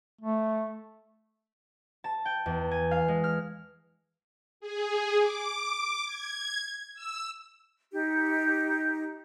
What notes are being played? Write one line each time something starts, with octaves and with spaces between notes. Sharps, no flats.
A3
A5
G5
E2
G#5
F5
G#3
F6
G#4
D6
G#6
E6
D#4 G4